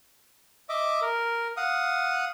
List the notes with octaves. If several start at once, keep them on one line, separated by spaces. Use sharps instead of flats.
D#5 E5 D6
A#4
F5 F#5 D#6